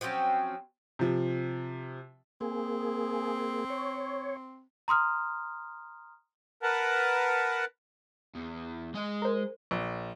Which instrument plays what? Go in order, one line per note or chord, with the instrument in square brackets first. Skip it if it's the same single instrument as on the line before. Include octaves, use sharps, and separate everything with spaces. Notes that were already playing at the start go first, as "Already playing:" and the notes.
[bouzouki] F3 F#3 C4 C#4
[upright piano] C3 F3
[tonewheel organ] A#3 G#4 [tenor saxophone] C4
[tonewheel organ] C#5
[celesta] A#5 C6 D#6 F6
[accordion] A#4 B4 F#5 A5
[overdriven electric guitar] E2
G#3 D#5
[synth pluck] A#4 C5
[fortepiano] A#1